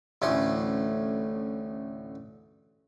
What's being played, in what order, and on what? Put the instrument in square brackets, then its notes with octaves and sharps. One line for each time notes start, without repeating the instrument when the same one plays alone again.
[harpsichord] A1 D2 A2 C#4 C6